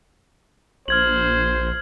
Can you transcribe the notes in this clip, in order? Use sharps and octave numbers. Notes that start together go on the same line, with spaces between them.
A#1 C5 F6 G#6 F#7